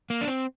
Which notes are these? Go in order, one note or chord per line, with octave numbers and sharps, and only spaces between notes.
A#3
D4
C4